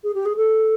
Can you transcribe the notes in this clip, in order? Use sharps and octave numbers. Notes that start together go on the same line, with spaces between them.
G#4
G4
G#4
A4